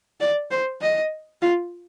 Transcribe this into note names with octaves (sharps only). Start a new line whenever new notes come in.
D5
C5
D#5
F4